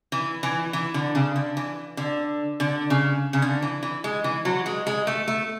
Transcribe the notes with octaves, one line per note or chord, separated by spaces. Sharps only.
E3
E3
E3
D3
C#3
D3
E3
D3
D3
C#3
C#3
D3
E3
E3
G#3
E3
F#3
G#3
G#3
A3
A3